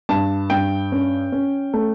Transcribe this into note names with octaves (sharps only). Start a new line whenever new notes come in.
G2 A5
G2 G5
C#4
C#4
A3